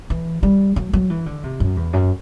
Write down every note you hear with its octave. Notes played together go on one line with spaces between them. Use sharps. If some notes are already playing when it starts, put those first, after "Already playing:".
E3
G3
F#3
F#3
E3
D3
C3
F#2
E2
F#2